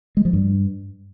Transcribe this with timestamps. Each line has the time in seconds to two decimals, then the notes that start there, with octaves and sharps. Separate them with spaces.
0.17 G#3
0.25 F3
0.33 G2